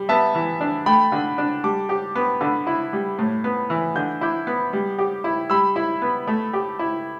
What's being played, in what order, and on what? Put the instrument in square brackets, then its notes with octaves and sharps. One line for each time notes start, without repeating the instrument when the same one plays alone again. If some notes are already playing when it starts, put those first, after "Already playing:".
Already playing: [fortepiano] G3
[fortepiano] B3 [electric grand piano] E5 A5
[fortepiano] E3
D4
[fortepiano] A3 [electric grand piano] G5 B5
[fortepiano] D3
D4
[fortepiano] G3 [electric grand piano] A5 D6
[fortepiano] G4
B3
[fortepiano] D3 [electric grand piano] B5 E6
[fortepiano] E4
G3
A2
B3
E3
[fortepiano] D3 [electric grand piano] G6
[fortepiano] E4 [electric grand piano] D6 G6
[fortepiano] B3
G3
G4
E4
[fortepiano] G3 [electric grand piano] B5 E6
[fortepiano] E4
B3
A3
G4
E4